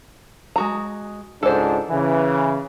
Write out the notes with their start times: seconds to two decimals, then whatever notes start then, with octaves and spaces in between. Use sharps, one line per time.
0.56 G#3 F#4 A#5
1.43 C#2 G#2 D4 A4 C5
1.89 C#3 E3